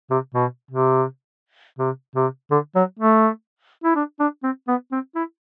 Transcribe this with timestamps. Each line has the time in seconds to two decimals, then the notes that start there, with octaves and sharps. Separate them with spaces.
0.10 C3
0.34 B2
0.71 C3
1.79 C3
2.15 C3
2.51 D3
2.76 F#3
2.99 A3
3.84 E4
3.96 D4
4.20 D4
4.43 C4
4.68 B3
4.92 C4
5.16 E4